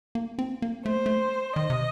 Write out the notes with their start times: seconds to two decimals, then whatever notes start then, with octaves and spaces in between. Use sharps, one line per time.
0.15 A#3
0.39 C4
0.62 A#3
0.86 A3 C5
0.96 A#3
1.06 A3
1.56 D#3 D#5
1.70 C3